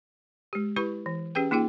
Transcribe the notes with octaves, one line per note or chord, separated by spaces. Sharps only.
G#3 G4
E4 G4 B4 B5 C#6
E3
C#4 G4 G#4 B4 G5
A#3 D#4 F4 G#4 G5